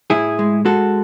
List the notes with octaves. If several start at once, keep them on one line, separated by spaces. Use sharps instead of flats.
A2 E4 G#4
G#3
G#3 F#4 A4